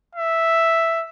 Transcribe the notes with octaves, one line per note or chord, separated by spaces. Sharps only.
E5